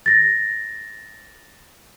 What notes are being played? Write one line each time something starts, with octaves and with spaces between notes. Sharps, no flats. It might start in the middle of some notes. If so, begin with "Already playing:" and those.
A6 A#6